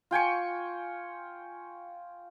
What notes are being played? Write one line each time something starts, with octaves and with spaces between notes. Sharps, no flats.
F4 G5 G#5 C#6